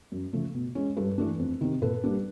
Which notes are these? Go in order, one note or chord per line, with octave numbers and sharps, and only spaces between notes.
F#2
C#3 F3 A3
B2
G#3 C#4
G2 A4 B4
E3 A3 D4
F2
C3 D#3
A#2 A4 B4
G3 A#3 D4